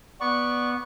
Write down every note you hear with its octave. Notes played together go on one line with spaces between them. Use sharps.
B3 D5 C#6